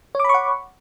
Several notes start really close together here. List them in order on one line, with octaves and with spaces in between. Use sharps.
C#5 D6 B5 C#6 F#5